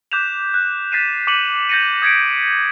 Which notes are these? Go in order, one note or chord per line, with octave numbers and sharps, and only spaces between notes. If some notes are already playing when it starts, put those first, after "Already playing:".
D6 F#6 G6 B6 E7 F7
F#6
F#6 A6 B6 C7 D#7 E7
D6 C#7 D#7 E7 F#7
G6 A6 A#6 C#7 D#7
D#6 G#6 B6 C#7 D7